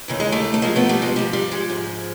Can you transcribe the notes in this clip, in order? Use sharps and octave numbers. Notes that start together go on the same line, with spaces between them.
D#2 C#3 E3 A3
G#3
G3 A3
A3
G#2 F3 G#3 A#3
A3 B3
G3 A3
G#3
G#2 F3 G3
G3
G#3
G#2 F3